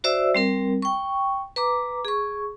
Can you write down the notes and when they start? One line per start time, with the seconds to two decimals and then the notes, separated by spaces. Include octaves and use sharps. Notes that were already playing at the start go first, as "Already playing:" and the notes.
0.04 F#4 C5 D5 E5 E6
0.35 G3 C4 A#4
0.82 G5 C#6
1.56 B4 A#5 D6
2.05 G#4 C#6